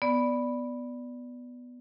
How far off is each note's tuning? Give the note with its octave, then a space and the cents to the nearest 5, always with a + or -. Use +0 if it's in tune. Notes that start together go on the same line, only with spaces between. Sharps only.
B3 +0 D5 +0